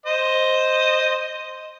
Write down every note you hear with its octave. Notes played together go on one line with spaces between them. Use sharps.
C5 D#5